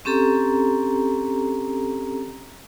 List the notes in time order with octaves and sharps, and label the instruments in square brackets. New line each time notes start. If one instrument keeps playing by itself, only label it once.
[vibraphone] C4 C#4 G4 A4 A#5